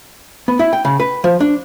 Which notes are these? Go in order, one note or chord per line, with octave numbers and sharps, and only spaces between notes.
B3
E4
G5
C#3
B4
F3
D4